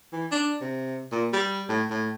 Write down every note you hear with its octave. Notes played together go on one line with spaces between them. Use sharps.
E3
D4
C3
A#2
G3
A2
A2